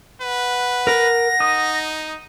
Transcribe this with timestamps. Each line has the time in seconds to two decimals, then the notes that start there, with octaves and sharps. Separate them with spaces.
0.21 B4 F#5
0.87 A#4 A#6
1.40 D#4 D#6